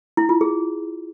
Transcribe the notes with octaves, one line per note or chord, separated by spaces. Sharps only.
E4
F4
G#4